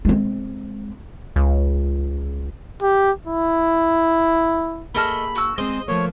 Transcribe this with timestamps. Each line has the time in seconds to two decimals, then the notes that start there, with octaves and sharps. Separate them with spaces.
0.05 G#3 C4
1.36 C#2
2.82 G4
3.27 E4
4.95 A3 A#3 G#4 D#5 A5 B5 F6
5.35 F#4 E6
5.58 G#3 C4 C5 D#5
5.88 F3 A3 A#3 C#5